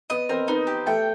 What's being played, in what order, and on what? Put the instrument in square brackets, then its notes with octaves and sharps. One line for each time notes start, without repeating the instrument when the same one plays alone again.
[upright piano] B3 B4 [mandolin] D#5
[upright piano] C4 C5 [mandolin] A#4
[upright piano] B3 B4 [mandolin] D#4
[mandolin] G4
[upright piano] A3 A4 [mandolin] G5